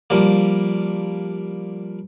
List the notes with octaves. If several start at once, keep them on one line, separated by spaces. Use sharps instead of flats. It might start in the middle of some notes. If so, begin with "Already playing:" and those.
F3 G3 A#3